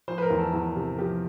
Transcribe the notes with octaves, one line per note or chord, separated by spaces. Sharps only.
F3 C5
B4
A#4
E2
A4
E2
C3
F3 G4